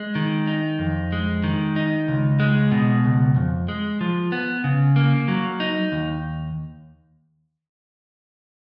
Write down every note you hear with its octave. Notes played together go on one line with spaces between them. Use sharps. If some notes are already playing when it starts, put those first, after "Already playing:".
Already playing: G#3
D#3
D#4
F2
G#3
D#3
D#4
C#2
G#3
B2
C#2
F2
G#3
F3
B3
C#3
A#3
F#3
D#4
D#2